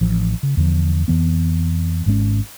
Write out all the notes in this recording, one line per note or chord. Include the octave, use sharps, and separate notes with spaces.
A1 F3
C#3
E2 D3 F3
F2 E3 B3
G#1 G#2 G#3 C#4